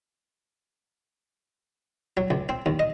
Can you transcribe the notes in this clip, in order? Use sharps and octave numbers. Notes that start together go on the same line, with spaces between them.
F#3
C#2
C4
D#2
D#5